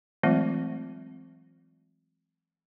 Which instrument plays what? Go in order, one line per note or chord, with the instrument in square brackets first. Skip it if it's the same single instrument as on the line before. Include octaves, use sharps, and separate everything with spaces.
[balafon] E3 F#3 G#3 A3 C4 F4